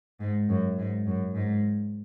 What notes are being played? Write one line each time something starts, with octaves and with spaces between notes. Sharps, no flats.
G#2
F#2
G#2
F#2
G#2